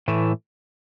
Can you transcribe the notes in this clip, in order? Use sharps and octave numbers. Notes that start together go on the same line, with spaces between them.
A2 E3 A3